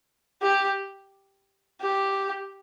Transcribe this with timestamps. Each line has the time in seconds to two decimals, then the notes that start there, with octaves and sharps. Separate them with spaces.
0.42 G4
1.81 G4